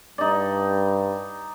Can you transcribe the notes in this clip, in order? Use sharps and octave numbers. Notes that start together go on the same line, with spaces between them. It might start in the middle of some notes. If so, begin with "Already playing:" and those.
G2 D#4 D5